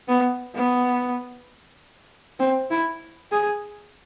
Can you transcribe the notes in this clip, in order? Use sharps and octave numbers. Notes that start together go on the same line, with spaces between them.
B3
B3
C4
E4
G#4